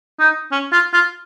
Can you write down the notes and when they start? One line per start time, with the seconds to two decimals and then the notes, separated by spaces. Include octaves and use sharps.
0.19 D#4
0.52 C#4
0.72 F4
0.93 F4